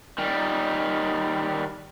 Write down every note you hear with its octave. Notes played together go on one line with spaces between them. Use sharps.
D#3 G3